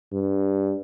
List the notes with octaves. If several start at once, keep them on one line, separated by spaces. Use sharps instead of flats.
G2